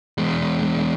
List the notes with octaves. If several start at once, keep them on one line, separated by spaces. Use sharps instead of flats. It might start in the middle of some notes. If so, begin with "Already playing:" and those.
E2 G#3